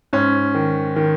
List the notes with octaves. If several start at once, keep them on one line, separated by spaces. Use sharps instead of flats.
G#2 C#4
D#3
D#3